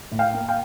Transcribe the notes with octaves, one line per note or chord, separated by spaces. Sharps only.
A2
F5 G5
A#3
F5 G5